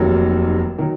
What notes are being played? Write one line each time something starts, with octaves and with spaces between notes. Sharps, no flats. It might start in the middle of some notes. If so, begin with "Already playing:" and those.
Already playing: F1 D#2 D#3 F#3
D#3 F#3